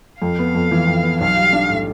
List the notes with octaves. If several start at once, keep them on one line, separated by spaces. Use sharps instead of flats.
F2 F5
B3
F2
E3
F2
B3
B1 F5
G3
D4
A2